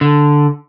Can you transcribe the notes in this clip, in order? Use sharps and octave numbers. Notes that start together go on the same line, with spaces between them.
D3